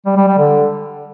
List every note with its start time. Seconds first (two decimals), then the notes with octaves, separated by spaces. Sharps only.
0.06 G3
0.17 G3
0.27 G3
0.38 D3